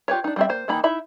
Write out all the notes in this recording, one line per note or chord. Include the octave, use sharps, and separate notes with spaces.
F4 G4 B4 C#5
D4 D#4
G3 C4 E5
A#3 C5
D#3 E3 A#3 D#4 B5
D#4 E4 E5 B5